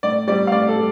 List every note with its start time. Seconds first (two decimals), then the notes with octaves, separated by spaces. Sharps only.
0.03 A2 D5
0.27 G3 C4 D5
0.47 F5
0.51 A2 D5
0.68 A4
0.76 G3